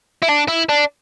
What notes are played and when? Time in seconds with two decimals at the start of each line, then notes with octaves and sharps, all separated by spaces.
0.22 E4
0.28 D4
0.48 E4
0.69 D4